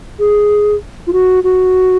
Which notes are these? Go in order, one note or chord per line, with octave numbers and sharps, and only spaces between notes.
G#4
F4
F#4
F#4